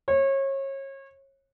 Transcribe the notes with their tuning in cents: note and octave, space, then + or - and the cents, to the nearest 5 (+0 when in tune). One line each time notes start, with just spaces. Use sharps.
C#5 -30